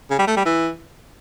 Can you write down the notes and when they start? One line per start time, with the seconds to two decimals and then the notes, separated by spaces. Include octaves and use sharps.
0.11 C#3
0.19 G3
0.28 A3
0.37 G3
0.45 E3